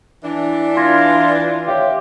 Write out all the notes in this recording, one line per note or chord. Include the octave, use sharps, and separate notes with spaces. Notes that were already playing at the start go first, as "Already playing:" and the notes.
E3 D4
F4 C6 G#6 A#6
G4 C#5 E5 F5